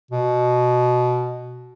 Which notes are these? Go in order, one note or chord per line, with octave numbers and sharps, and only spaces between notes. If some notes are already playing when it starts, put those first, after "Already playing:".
B2